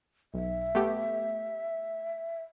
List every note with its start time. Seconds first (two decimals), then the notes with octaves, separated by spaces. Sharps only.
0.34 B1 E5
0.75 A3 B3 G4